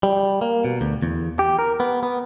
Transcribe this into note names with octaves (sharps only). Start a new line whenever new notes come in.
G3
A#3
B2
D2
E2
G4
A#4
B3
B3